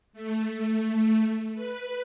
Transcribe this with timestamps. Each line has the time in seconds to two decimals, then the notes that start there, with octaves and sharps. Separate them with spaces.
0.13 A3
1.54 B4